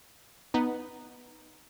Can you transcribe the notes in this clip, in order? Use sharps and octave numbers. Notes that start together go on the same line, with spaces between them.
B3 D#4